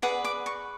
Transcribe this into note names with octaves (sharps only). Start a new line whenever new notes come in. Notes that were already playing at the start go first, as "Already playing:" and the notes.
G#4 B4 D5 F#5
D6
C#6